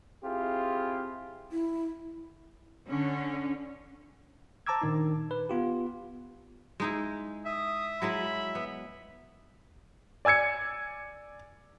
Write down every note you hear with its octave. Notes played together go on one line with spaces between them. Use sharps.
C4 E4 F4 G4 G#4
E4
D3 C#4
C5 A5 A#5 D6 E6 G#6
A#2 D#3 D4 D#4
B4
B3 F4 G4
G#3 D#4 E4
E5 D#6
F#3 G#3 E4 B5
B3
D5 G#5 E6 G#6 C#7